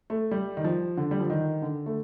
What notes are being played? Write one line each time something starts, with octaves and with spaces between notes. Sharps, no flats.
A3
G3
D#3
F3
D3
G3
F3
D#3
D3
A3